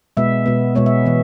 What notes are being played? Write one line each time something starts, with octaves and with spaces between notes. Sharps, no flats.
B2 G#3 B3 E5
B2 G#3 B3
B2 G#3 B3 C#5
E5
E3 B3